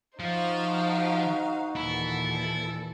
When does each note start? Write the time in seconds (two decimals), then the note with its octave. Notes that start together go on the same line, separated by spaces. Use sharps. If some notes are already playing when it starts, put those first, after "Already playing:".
0.20 F3 D#4 F#4 C5 F5
1.76 D#2 A#2 E3 E4 A4